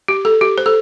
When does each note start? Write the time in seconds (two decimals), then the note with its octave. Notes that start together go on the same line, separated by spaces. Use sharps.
0.08 G4
0.25 A4
0.41 G4
0.58 C5
0.66 A4